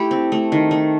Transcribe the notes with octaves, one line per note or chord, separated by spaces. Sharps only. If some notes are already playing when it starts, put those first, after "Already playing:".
Already playing: A3 E4 G4
C4
A3
D#3
A3